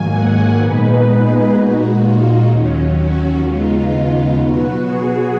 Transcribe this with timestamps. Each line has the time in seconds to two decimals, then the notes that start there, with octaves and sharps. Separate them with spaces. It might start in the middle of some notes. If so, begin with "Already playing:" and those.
Already playing: G#2 D#3 F#3 A#3 G#5
0.10 F#5
0.57 A#2 G#3 B3 D#4 B4
1.05 G#4
1.51 A#2 G#3 D#4 F#4
1.99 F4
2.46 D#2 D#3 F#3 C#4
2.94 F#4
3.40 D#2 C#3 G#3 B3 D#4 F4
3.88 F4
4.35 B2 F#3 B3 F#4
4.83 G#4